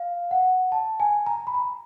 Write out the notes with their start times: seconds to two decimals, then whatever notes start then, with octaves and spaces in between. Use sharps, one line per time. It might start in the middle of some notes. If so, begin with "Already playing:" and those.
Already playing: F5
0.31 F#5
0.72 A5
1.00 G#5
1.26 A#5
1.47 B5
1.54 A#5